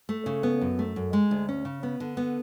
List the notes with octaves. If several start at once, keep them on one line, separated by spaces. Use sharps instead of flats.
A3
C#3
B3
F#2
A3
F#2
G#3
D2
C#4
C#3
B3
D3
B3